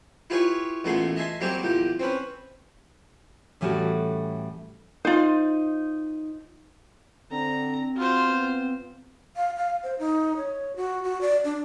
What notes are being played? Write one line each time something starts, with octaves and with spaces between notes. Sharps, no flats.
E4 F4 G4 G#4 B4 C#5
A1 A#2 A3 B3 G#4 C6
D#5 E5 G#5 A5 C6
F#3 G3 A#3 C4 G4 G#4
E2 A#2 G4
C4 C#4 B4
A2 E3 G3 C#4 F#4 A4
D#4 F4 C5
D3 C4 A#5
F4 F#4 C5
B3
F5
F5
C5
D#4
C#5
F#4
F#4
D5
D4